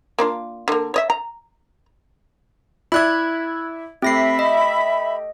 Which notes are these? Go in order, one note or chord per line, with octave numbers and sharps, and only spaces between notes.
A#3 D4 F4
D3 A#3
C#5 D#5 E5
A#5
E4 D5 E5 B5 F#6 G#6
A3 C4 G4 E5 B5 A#6 C7
D#5